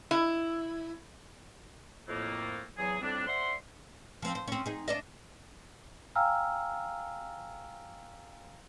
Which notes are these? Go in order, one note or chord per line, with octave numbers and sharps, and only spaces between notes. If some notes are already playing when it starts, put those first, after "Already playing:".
E4
F2 A2 A3 A#3
E2 F#3 G#4
F2 A2 G3 C4 D4
C5 D5 E5 F#5 C6
F3 C4
C5
C4 C#4
D#4 G#4
D4 D5 D#5
F5 G5 G#5 A#5 E6 F6